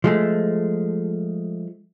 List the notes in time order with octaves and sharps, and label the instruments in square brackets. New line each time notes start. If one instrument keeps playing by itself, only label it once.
[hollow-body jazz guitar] F3 G#3 A3